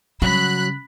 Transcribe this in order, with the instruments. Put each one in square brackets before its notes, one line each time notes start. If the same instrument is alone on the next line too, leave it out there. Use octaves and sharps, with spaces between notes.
[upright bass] C#3 [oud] F#3 F#4 [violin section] B5 F#6